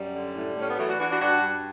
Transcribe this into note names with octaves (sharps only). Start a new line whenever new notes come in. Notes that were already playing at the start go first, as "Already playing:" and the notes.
Already playing: F#2 G3
D3
A2
A2 C#4
B3
E3 F#3 A3
D4 F#4
E3 D4 F#4
D4 F#4
G2 D4 F#4
G2